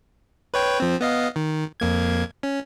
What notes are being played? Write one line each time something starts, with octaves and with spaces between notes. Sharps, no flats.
B4 C#5 G5
F3 C4
B3 D#5 F5
D#3
F2 A#3 G#6
C#4